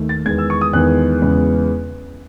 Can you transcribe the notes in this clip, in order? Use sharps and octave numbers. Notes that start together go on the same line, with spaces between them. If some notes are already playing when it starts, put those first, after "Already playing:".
Already playing: D#2 A3
A6
E2 D#3 G#3 B3 G#6
E6
C#6
D#6
E2 D#3 G#3 B3 F#6
E2 C#3 G#3 B3